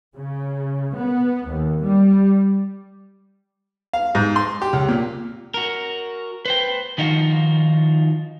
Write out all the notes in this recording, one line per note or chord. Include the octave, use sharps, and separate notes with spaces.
C#3
B3
D#2
G3
F5
G#2
C6
G4
C#2
A#2
F#4 A#4
B4 C5 G5
D#3 F3 D#4 F4 F#4